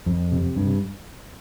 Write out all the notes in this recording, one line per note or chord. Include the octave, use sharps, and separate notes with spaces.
F2
C3
G2